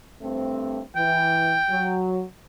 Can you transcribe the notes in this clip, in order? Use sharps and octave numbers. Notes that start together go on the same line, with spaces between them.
G2 A3 C4
E3 G5
F#3